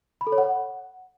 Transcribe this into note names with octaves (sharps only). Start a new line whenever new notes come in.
B5
A4
C#5
F#5